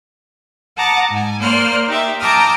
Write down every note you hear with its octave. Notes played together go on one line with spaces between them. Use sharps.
F#5 A5 A#5 D6 D#6
G#2 G#5
A#3 C5 D5 C6 F6 F#6
D#4 G4 E5
G5 A5 A#5 D6 D#6 F6